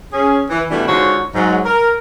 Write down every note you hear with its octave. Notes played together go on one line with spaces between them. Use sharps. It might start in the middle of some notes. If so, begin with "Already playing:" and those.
C#4 G#4
E3
B2 E3 G3 A3 B3 D4
G#2 D3 F4 F#4 C5 C#5
G#2 F#3
A#4